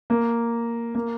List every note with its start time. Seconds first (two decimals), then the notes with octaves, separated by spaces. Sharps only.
0.10 A#3
0.95 A#3